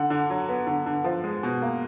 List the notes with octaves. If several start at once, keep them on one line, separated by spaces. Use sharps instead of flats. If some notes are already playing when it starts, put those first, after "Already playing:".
Already playing: D3 F#5
D3
F#3
B3
D3
D3
F3
G#3
B2
A#3